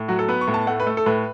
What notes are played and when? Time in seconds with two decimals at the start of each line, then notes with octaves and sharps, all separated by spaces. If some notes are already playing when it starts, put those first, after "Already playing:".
Already playing: A2
0.08 F#3 F#4
0.19 A4
0.28 B3 B4
0.41 C#6
0.48 A2
0.54 A5
0.67 A3 F#5
0.80 B4
0.87 A3 A4
0.97 A4
1.06 A2 B4